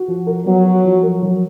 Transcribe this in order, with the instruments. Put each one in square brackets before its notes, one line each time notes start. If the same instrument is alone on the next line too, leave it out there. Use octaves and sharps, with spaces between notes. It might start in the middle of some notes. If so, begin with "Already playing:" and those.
Already playing: [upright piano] F#4
F3
A#4
[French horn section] F#3 [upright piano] B3
[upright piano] F#4
F3
A#4
F#3